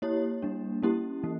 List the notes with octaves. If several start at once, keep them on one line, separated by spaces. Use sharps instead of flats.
A#3 E4 G4 C#5
G3 A#3 D4
A#3 C#4 E4 G4
E3 A#3